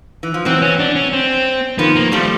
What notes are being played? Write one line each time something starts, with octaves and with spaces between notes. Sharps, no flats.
E3
F3
E3 F#3 C4
C#4
D4
C#4
C4
D#3 F3 B3
A#3
F3 G3 A3